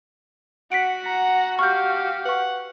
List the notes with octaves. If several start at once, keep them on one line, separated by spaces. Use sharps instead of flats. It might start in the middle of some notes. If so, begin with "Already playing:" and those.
F#4 F#5 B6 C#7 D7
A#5
G4 F5 C#6 F6 G6
B4 F#5 C#6